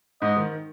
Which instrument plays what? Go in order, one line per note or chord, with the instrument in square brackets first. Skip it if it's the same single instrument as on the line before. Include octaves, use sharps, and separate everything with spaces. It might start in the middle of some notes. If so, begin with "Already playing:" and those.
[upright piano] G#2 [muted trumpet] D#5
[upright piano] D#3